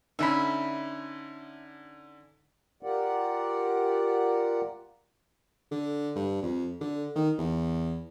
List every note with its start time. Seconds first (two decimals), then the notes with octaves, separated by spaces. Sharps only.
0.19 D3 C#4 D#4 E5 B5
2.83 F4 G4 A#4 D5 F#5
5.71 D3
6.16 G2
6.42 F2
6.81 D3
7.16 D#3
7.38 E2